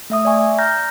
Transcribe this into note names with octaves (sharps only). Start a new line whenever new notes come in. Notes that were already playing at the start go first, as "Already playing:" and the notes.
A3 E5 D#6
D5 E5 G#5 C#6
A#5 F6 G6 A#6